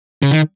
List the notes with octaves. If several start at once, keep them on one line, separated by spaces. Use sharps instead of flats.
C#3
D#3